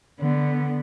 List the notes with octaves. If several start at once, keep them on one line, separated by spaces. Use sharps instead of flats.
D3 B3